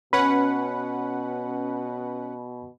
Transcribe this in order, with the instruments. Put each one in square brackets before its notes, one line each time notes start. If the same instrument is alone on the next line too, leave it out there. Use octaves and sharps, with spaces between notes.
[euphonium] B2 [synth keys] C#4 B4 F#5 [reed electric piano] B5